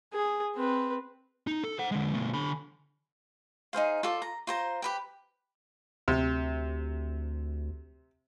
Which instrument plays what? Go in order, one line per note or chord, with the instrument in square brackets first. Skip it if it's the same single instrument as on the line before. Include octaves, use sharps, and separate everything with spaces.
[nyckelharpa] G#4
C4 B4
[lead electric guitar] D#4
A4
C5 F#5
D3 G#3
B2 A3
D3 B5
[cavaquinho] D#4 G#4 C5 F5
F4 A4 D5
A#5
F4 C5 A#5
G4 B4 G5
[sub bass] D2 [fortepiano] C3